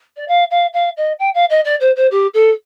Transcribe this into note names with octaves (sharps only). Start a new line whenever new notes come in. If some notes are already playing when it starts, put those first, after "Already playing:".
D5
F5
F5
F5
D#5
G5
F5
D#5
D5
C5
C5
G4
A4